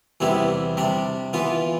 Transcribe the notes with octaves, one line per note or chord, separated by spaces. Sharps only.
E2 C3 G3 B3 E4
C3 G3 D4
E3 B3 F4